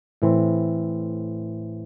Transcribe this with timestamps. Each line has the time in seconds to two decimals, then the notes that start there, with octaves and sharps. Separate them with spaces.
0.22 A2 E3 C4